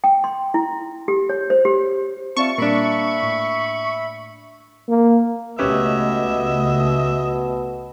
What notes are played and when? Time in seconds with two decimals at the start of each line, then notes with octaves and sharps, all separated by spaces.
0.04 G5
0.24 C6
0.54 E4
1.08 G4
1.29 C#5
1.50 C5
1.65 G4
2.37 C4 F4 D5 E5 A5 C#6
2.58 A#2 G3 A#3 D4 E5 B5
3.22 A2
4.89 A#3
5.59 C#2 B2 A3 C#4 G4 B4 D#5 E5